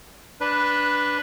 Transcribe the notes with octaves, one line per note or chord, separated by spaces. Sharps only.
D4 B4